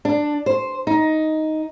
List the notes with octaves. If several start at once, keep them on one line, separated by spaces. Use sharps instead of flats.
D4
C5
D#4